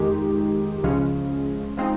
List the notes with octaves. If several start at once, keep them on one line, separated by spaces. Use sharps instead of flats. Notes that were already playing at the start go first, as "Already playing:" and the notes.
Already playing: F2 D#3 G#3 D#4 G4
C#2 C#3 F3 G#3 C#4
F3 G#3 C4 D#4